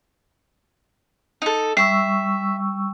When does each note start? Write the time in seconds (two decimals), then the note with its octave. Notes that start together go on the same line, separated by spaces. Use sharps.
1.42 D#4 A4
1.77 G3 E5 C#6 E6